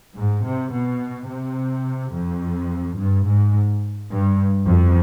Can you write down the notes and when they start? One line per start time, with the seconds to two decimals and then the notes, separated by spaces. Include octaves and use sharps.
0.15 G#2
0.44 C3
0.72 B2
1.28 C3
2.13 F2
2.98 G2
3.26 G#2
4.11 G2
4.67 F2